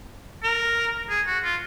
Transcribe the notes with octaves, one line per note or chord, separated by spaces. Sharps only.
A#4
G#4
F#4
F4